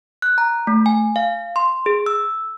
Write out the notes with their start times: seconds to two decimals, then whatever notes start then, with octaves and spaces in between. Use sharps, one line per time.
0.22 F#6
0.38 A#5
0.67 A3
0.86 G#5
1.16 F5
1.56 C6
1.86 G#4
2.06 E6